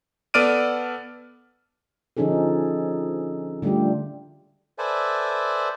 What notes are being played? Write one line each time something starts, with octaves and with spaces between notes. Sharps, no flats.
B3 A4 D5 F6 D7 D#7
D3 F3 C#4 D#4 G#4 A4
D3 G3 A3 D4 F4 G4
A4 B4 C5 D5 E5 G#5